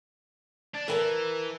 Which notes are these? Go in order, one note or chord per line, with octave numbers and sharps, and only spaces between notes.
D4
E3 A#4 G#5 A5